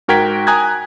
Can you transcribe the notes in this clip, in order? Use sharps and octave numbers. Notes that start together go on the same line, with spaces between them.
G#2 F#4 A#4 G5 G#6 B6
G5 G#5 A#5 D#6 F#6 G#6